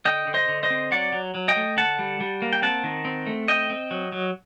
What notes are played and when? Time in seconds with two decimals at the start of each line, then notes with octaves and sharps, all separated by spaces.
0.05 D3 D#5 G5
0.27 D3
0.34 C5 D#5
0.48 D3
0.63 C5 D#5
0.70 C4
0.91 F#3 D5 F#5
1.12 F#3
1.35 F#3
1.48 D#5 G5
1.56 A3
1.77 D3 F#5 A5
1.99 G3
2.20 G3
2.42 A#3
2.53 G5
2.62 C4 F#5 A5
2.84 D#3
3.05 C4
3.27 A3
3.48 C4 D#5 G5
3.70 C4
3.91 F#3
4.12 F#3